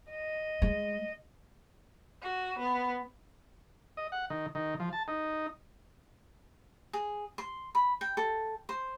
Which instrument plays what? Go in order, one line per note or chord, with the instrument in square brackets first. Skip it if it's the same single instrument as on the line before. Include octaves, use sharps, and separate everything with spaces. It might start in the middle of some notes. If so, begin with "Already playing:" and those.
[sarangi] D#5
[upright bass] G#3
[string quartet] F#4
B3
[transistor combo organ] D#5
F#5
D#3
D#3
F3
A5
D#4
[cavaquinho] G#4
C6
B5
G5
A4
C5